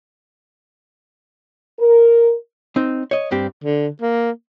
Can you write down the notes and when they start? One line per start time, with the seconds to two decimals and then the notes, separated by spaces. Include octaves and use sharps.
1.79 A#4
2.76 C4 D#4
3.11 C#5 D#5
3.31 G2 C4 G4
3.64 D3
4.01 A#3